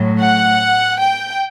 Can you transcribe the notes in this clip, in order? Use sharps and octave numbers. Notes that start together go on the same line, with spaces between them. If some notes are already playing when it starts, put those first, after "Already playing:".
Already playing: A2 F#3
F#5
G5